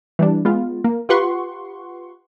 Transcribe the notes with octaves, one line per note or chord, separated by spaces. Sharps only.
E3 G3 D4
G#3 B3 F4
A#3
F4 G4 B4 F#5 C6 C#6